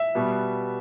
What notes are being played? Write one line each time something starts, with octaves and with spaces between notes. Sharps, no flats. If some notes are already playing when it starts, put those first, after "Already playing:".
Already playing: E5
B2 G3 B3